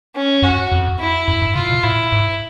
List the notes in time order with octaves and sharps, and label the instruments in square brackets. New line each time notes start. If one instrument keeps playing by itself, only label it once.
[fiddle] C#4
[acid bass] F#2 [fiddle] F#4
[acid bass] F2
[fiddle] E4
[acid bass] F#2
G2
[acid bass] C#3 [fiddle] F4
[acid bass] B2
[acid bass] A2 [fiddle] E4
[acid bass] G#2